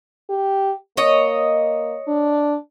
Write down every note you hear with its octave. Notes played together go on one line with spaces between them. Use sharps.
G4
A#3 C#5 D#5
D4